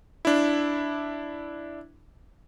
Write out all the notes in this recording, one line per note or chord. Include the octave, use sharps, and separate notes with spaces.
D4 E4